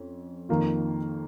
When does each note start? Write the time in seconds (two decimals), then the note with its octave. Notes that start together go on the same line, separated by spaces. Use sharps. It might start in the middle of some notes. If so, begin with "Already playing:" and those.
Already playing: F2 C#4
0.49 F2 D#3 A#3 F4